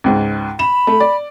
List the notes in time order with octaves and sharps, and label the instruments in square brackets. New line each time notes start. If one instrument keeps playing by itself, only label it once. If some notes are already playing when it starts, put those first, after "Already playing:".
[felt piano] C#2 G#2
[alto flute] B5 [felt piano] E7
[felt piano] A3
D5